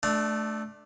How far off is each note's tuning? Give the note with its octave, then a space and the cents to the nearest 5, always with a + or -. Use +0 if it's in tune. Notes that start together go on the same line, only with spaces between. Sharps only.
A3 -15 D4 +10